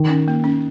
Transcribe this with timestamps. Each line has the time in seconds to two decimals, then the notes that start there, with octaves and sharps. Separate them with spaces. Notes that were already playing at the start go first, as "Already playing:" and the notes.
Already playing: D#3
0.09 C#4
0.28 A#3
0.44 C#4